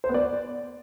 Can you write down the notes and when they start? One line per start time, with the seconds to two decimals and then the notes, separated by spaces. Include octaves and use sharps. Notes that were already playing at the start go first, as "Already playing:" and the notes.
0.04 C5
0.09 B3
0.14 D5